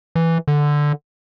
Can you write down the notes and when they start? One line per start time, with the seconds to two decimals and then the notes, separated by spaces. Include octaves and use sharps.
0.16 E3
0.48 D3